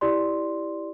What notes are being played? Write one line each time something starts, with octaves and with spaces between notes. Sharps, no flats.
E4 G4 D5 C6